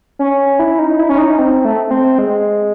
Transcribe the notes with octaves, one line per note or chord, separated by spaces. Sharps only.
C#4
E4
D#4
E4
C#4
D#4
C4
A3
C4
G#3